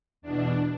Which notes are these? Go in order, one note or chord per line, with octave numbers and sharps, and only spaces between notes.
E2 B2 D4